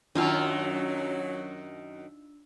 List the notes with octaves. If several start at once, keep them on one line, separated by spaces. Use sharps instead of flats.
F#2 D#3 F#3 D4 D#4 F4 F5 E6